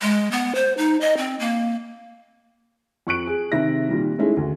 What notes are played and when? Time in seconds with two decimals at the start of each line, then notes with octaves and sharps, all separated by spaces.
0.02 G#3
0.32 B3
0.55 C5
0.78 D#4
1.01 D#5
1.17 C4
1.40 A#3
3.07 F2 C#6 F#6 D7
3.27 G#4
3.52 C3 D#3 E5 A#6
3.89 A#2 D#3 G3
4.19 G#3 A3 C#4 D#4 E4 G#4
4.37 D2